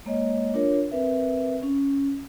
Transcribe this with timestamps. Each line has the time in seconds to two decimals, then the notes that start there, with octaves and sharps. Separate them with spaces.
0.05 G#3 A#3 C#5 D#5
0.54 D4 F4 A#4 C#5
0.91 C4 A#4 B4 E5
1.63 C#4